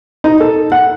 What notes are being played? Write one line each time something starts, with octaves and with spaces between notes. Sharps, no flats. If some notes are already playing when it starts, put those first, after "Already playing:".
D#4
A4
F#5